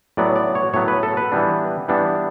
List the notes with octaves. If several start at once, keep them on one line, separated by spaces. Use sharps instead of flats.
A2 F#3 B3 D5
D5
C#5
A2 F#3 B3 C#5
B4
A4
B4
E3 G3 B3 D4
E3 G3 B3 D4